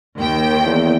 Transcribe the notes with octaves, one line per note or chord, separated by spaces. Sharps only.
D#2 G5
E2